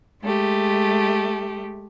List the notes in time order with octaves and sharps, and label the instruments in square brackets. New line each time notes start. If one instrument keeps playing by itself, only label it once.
[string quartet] G#3 A3 G4